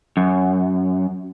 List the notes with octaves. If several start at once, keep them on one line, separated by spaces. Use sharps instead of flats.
F#2